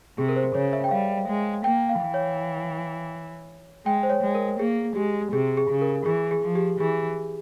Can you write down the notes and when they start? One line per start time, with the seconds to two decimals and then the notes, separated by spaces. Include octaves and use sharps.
0.18 C3 G#4
0.29 A#4
0.36 C5
0.55 C#3 C#5
0.73 E5
0.84 G5
0.91 G3 F5
1.28 G#3
1.64 A#3 G5
1.89 F5
2.02 E3
2.14 C#5
3.86 G#3 G5
4.03 C5
4.10 C#5
4.23 G#3
4.35 A#4
4.59 A#3 G#4
4.96 G#3 G4
5.32 C3 G#4
5.57 G#4
5.70 C#3
5.81 A#4
6.06 E3 G#4
6.31 G#4
6.43 F3
6.55 G4
6.80 E3 G#4